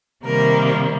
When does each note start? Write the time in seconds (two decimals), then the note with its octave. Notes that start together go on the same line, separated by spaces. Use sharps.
0.24 C3 D#3 G3 A#3 A#4